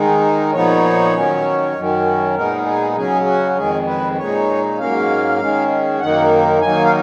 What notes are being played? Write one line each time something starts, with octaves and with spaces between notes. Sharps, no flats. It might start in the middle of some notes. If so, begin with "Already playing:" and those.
Already playing: D#3 G#3 D#4
A#2 F3 B3 D#4 C#5
D#3 F#3 C#4
F#2 D#3 F#3 C#4
A#2 G#3 B3 D#4 A#4
G#4
C#3 F#3 C#4 G#4
F#4
F2 D#3 G#3 G#4
B4
A#2 G#3 D#4 C#5
G#2 F#3 A#3 C#4 F5
D#3 G#3 C#4
F#2 D#3 A#3 D#4 F#5
D#3 F#3 A#3 D#4 G#5
F5